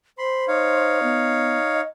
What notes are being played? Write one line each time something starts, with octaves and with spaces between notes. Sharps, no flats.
C5 B5 C6
D#4 C#5 F5
B3
D#5